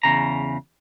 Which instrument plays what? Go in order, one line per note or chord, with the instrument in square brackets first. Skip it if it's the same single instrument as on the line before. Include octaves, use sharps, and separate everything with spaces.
[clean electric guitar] E2 C#3 A#5